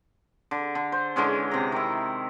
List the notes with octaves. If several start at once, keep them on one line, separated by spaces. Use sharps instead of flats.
D3
D3
C5
D3 E3 G#3 C#4
C3 A#5
D#3 E4